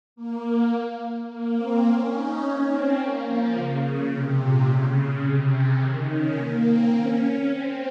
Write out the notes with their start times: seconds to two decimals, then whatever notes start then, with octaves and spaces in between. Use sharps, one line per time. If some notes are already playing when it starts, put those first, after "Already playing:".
0.16 A#3
1.29 A#3
1.57 C4
1.85 C#4
2.13 D#4
2.41 C#4
2.69 C4
2.98 A#3
3.26 F3
3.54 C#3
4.10 C3
4.38 A#2
4.67 C#3
5.23 C3
5.51 C#3
5.79 D#3
6.07 C#4
6.35 A#3
6.64 C4
6.91 C#4
7.20 C#4
7.48 C4